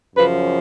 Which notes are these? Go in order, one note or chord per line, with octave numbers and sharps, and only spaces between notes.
F#2 C#3 F3 B4